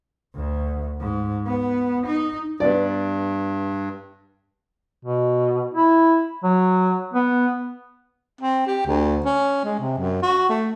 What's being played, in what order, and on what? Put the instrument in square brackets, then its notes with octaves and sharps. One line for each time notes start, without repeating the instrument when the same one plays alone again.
[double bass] D2
G#2
B3
D#4
[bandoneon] G2 [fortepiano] B3 D5
[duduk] B2
E4
F#3
B3
[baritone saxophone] C4
G4
D2
C#4
G#3
C3
F#2
F#4
A3